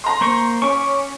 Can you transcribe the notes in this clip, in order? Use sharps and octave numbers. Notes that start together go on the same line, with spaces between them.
A#5 C6
A#3 C5 C#6
C#4 C#6 D6